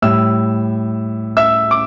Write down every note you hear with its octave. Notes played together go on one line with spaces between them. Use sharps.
A2 G3 E5 E6
E5 E6
D6